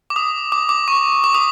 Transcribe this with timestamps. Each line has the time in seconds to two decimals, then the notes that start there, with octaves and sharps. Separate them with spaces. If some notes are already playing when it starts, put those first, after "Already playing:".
0.10 D6
0.16 D#6
0.52 D6
0.69 D6
0.88 C#6
1.24 D6
1.35 D#6